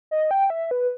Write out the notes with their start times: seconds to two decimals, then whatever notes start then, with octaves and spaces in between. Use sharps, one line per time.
0.11 D#5
0.31 G5
0.50 E5
0.71 B4